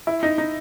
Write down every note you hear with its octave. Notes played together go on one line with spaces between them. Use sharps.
E4
D#4
D#4